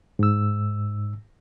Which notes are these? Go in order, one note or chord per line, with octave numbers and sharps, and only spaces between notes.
G#2 E6